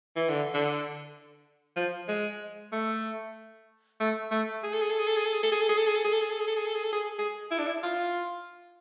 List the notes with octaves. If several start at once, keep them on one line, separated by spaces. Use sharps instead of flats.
E3
D3
D3
F3
G#3
A3
A3
A3
G#4
A4
G#4
A4
G#4
A4
G#4
A4
G#4
A4
G#4
A4
G#4
A4
G#4
A4
G#4
A4
G#4
A4
G#4
A4
G#4
A4
G#4
A4
G#4
G#4
E4
D4
E4
F4